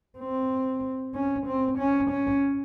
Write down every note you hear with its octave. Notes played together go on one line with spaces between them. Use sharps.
C4
C#4
C4
C#4
C#4